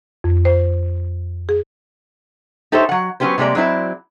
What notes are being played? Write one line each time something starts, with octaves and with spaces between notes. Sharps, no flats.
F2
C5
G#4
D#4 G4 A4 C5 C#5 E5
F#3 F#5
F#3 B3 C#4 G4 C5
C3 G3 G#3 A#3 D5
F#3 G#3 C4 E4 D5